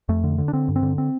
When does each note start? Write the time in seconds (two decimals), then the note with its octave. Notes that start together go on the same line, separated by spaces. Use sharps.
0.09 F2 A3
0.24 D3
0.38 D3
0.48 D4
0.53 D3 C4
0.68 G2
0.76 C4
0.83 D3
0.98 C4